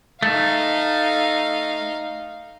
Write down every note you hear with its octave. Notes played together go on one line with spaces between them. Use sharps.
A3 D#4 F5